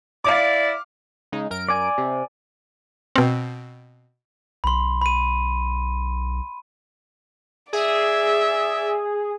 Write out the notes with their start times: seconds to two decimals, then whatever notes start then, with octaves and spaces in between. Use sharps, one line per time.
0.24 E4 D5 F5 D6
1.32 C#3 G#3 D#4
1.50 F#2 A#4 D7
1.69 D5 G#5
1.98 C3
3.16 B2 C4
4.64 B1 B5 C6
5.02 B5 D#7
7.73 G#4 D5 E5